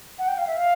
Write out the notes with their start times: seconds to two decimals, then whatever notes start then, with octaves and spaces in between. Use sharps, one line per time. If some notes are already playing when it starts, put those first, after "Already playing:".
0.19 F#5
0.28 G5
0.38 F5
0.47 E5
0.57 F5